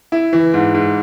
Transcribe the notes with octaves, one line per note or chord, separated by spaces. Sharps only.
E4
E3
G#2
G#2